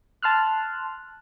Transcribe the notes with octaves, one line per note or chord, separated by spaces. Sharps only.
A5 C6 F6 F#6